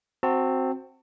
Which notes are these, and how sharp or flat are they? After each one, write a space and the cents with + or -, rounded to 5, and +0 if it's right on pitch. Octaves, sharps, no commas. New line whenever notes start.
C4 +5 F#4 +0 A5 +35